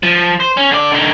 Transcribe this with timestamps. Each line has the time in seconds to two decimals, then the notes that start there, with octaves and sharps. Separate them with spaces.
0.03 F3
0.40 C5
0.57 C#4
0.71 D3 D5
0.92 D3 D#4